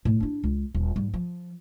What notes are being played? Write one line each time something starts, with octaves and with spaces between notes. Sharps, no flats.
A2
D4 E4
C#2
D#1
G#2 G3
F3